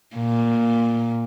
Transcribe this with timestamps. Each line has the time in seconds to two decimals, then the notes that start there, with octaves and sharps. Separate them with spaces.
0.16 A#2